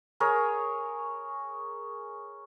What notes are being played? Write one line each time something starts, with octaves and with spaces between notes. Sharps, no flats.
G#4 A#4 C#5